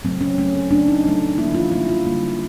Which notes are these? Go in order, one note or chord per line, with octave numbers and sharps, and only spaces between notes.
C#3 F#3 A3 C4
C#4
C#3 F#3 A3 C#4
C4
C#3 F#3 A3 D4
D#4
C#3 F#3 A3
D3 G3 A#3 E4
F4
D3 G3 A#3 E4
F4
D3 G3 A#3